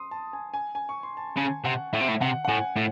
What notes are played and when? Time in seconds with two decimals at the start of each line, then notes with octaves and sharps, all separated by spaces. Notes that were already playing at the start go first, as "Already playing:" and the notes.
Already playing: C6 D#6
0.11 A5
0.33 G#5
0.54 G#5
0.75 G#5
0.89 C#6
1.03 C6
1.17 A5
1.37 C#3 G#5
1.65 C3 F#5
1.93 A2 E5
2.01 C3
2.08 A2
2.21 C3 F#5
2.45 F#5
2.49 A2 G#5
2.77 A2